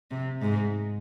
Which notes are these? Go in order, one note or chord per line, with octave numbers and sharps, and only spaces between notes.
C3
G#2